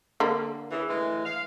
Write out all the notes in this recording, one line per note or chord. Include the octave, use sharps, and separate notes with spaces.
D3 A#3
C#3 E3
A2 E3 G#3
F5